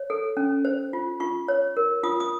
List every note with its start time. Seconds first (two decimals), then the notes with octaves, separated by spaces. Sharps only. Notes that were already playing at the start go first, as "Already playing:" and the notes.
Already playing: C#5
0.10 A4
0.37 C#4
0.65 C5
0.93 F4
1.20 F4 C#6
1.48 C#5
1.77 A#4
2.03 F4 D#6
2.20 D#6